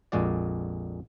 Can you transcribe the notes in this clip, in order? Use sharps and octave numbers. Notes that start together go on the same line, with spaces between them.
A#1 F2 A#2 G#3 F#4 D5